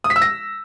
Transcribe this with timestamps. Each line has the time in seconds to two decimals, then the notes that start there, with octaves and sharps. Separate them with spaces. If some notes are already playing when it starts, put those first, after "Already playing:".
0.04 D#6
0.10 B6
0.16 E6
0.22 A#6